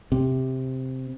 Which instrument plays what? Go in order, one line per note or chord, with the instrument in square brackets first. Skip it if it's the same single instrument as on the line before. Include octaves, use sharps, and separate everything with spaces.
[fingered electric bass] C3